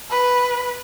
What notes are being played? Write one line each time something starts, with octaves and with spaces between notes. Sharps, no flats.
B4